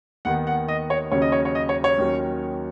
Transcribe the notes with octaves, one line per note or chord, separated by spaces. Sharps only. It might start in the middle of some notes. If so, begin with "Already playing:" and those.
D#2 D#3 B3 F#5
F#5
D#5
C#5
D#2 C#3 F#3 C#4 C#5
D#5
C#5
C#5
D#5
C#5
C#5
D#2 D#3 F#3 C#4